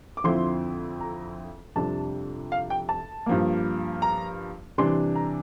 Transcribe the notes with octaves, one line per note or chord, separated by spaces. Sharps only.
D6
F2 D3 F3 C4 E4 C6
A#5
F2 C3 G3 D4 A5
F5
G5
A5
G2 F3 A#3
A#5
C3 E3 G3 D4 C6
A#5